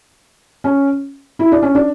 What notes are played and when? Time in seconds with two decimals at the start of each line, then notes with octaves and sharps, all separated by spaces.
0.64 C#4
1.39 E4
1.52 D4
1.62 C#4
1.75 D4